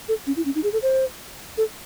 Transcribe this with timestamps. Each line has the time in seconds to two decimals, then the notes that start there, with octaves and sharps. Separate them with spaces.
0.09 A4
0.27 C#4
0.37 E4
0.45 C#4
0.55 D#4
0.64 G#4
0.73 A4
0.82 C5
1.58 A4